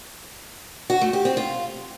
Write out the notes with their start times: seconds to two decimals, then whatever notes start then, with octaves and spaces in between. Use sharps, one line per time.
0.90 F#4
1.01 A3
1.13 G4
1.25 C4
1.37 F4